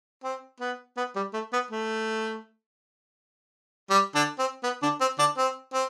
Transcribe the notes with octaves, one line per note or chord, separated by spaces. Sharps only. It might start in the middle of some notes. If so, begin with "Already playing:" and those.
C4
B3
B3
G3
A3
B3
A3
G3
D3 D4
C4
B3
D3 D4
C4
D3 D4
C4
C4